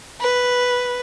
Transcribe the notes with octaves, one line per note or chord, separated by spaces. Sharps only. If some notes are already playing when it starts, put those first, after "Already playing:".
B4